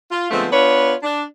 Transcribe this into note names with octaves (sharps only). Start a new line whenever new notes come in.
F4
D3 F3 G#3 A3 B3 C4
B3 D4 F4 B4 C#5
D4